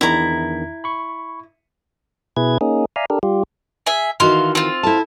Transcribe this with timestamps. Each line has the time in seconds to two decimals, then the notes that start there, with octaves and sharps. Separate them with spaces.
0.01 E2 D#3 D4 E4 A#5
0.84 B5 C#6
2.37 B2 E4 G#4 B4 G#6
2.61 A#3 C#4 D#4 G#4
2.96 D5 E5 F5 G#5 A#5
3.10 D4 G4 A4 A#4
3.23 G3 F4 G4
3.87 G#4 E5
4.20 D#3 E3 F#4 F5 C6
4.55 C4 F4
4.83 E4 A4 A5